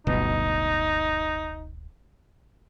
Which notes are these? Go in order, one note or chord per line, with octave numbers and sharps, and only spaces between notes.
D1 G1 B2 D#4